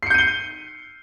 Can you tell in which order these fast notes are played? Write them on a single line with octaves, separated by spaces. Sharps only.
C7 C#7 G6 D#7 G7